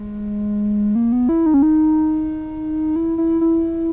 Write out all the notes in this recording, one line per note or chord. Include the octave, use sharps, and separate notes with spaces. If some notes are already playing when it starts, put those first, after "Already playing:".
Already playing: G#3
A#3
B3
E4
D#4
C#4
D#4
E4
E4
E4